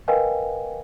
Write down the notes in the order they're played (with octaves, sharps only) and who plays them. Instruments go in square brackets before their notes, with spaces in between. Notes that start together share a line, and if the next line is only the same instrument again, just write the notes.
[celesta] A#4 B4 D#5 F5 G5 G#5